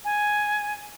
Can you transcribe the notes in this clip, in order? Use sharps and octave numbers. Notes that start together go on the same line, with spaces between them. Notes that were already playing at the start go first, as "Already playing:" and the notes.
G#5